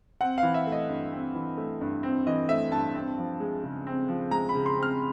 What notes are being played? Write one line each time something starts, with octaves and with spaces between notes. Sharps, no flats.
C4 F#5
F5
E3
E5
A3
D#5
G2
C4
E3
A3
G2
C4
E3 D#5
A3 E5
G2 A5
C4
F3
G#3
C#3
C4
F3
G#3 A#5
B5
C#3
C6
C4
F6